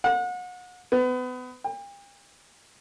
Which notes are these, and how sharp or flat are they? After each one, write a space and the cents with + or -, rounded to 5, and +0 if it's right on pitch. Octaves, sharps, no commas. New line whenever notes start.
F#5 -35
B3 +30
G5 +40